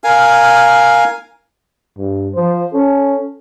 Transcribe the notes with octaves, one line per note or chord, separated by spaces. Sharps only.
A#4 F5 G#5
G2
F3 C5
C#4 A4